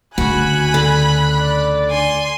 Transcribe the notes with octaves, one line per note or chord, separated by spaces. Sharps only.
D2 C#3 F#4 G#5 B5 F#6
D3
D5
G#5 C6